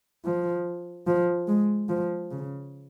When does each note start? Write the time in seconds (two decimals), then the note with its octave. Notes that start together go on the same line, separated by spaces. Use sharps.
0.25 F3
1.07 F3
1.48 G#3
1.89 F3
2.31 C#3